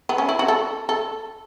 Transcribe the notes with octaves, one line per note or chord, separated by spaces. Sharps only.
B3
C#4
E4
F#4
A4
A4